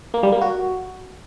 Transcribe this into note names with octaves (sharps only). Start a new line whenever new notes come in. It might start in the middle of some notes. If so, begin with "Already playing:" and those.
A#3
G3
A#3
F#4